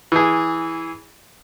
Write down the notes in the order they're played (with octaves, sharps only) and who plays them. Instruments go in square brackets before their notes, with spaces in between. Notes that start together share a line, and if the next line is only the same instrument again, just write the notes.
[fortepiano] E3 G#4